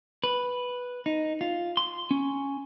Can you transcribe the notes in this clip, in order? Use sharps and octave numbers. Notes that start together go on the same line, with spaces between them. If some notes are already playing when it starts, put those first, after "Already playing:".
B4
D#4
F4
C6
C#4